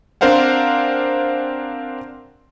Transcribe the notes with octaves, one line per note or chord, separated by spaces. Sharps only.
C4 D4 A#4 C5 F5 F#5